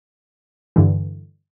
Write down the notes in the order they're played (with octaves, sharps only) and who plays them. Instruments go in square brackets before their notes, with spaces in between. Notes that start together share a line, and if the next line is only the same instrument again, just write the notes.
[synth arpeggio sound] G2 D3 E3